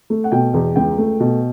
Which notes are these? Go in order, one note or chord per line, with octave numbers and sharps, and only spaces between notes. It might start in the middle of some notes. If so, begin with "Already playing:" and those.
A3
F#5
B2 G5
E2
C#2 G5
A3
B2